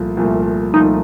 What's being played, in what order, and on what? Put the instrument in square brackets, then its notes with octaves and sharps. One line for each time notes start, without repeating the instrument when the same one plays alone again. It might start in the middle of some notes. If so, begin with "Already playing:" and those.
Already playing: [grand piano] C2 A#2 F3 A3
C2 A#2 F3 A3
[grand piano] C2 A#2 F3 A3 [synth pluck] D#4